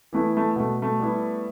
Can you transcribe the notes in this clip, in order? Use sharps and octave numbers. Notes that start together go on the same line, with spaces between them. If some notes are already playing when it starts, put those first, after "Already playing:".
E3 A3 B3 E4
A3
B2 A3
A3
G3 B3 E4